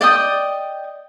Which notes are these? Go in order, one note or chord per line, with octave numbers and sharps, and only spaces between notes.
D5 D#5 G5 D#6